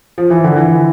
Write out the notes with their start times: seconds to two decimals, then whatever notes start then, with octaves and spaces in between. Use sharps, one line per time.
0.18 F3
0.30 E3
0.44 D3
0.56 E3